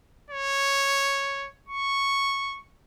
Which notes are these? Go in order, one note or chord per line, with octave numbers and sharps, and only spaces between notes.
C#5
C#6